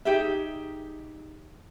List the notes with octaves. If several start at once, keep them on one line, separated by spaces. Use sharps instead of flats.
D#4 G4 G#4 E5